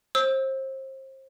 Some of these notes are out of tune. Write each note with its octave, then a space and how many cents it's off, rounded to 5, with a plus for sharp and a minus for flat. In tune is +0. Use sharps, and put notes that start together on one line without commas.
C5 +30 E6 -15